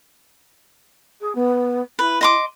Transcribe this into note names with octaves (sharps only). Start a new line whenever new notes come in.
G#4
B3
E4 B4
D#5 C6 D6